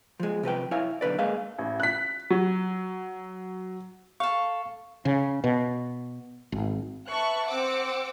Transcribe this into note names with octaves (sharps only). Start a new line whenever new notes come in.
F3 G#3
C3 F3 B4 G5
E4 C#5 F5 G#5
B1 D3 B4 D5
G#3 A#3 G#4 D#5 F5
A1
F#6 B6
F#3
A4 F5 C#6
C#3
B2
G#1
B4 E5 A5 C#6 F#6
C4 C5 F#5 D6 E6 C#7